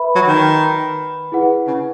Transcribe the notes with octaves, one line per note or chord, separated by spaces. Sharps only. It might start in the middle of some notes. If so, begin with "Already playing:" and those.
Already playing: B4 E5 B5
F#3
D#3
E4 G#4 B4 F#5
C#3